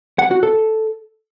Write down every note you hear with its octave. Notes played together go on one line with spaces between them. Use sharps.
F#5
F#4
A4